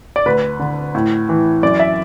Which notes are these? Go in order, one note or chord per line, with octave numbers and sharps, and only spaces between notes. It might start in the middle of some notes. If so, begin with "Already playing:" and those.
D5
D2 B4
D3
A2
E3
F#2 D5
E5